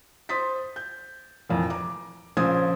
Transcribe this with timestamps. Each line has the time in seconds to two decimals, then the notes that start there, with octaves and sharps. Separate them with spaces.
0.29 C5 C6 D#6 A6 B6
0.76 G6
1.49 F1 F2 A#2 E3
1.70 A#5 D6
2.37 A#1 C#3 F3 C5 D#6 G#6